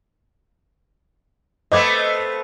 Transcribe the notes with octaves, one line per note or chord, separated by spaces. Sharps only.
A3 B3 C4 D#5 D6 G#6